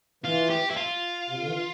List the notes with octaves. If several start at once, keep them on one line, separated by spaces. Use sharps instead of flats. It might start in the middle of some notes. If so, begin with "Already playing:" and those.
E3 F4
G4
E4
F4
C3
D3
E3